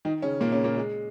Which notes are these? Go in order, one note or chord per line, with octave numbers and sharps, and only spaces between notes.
D#3 D#4
C#3 C#4
A#2 A#3
C#3 C#4
A#2 A#3
G#3